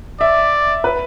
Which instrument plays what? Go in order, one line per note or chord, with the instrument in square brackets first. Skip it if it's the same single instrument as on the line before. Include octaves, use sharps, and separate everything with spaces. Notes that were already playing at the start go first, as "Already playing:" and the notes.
[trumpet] D5 [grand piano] E5
[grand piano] B4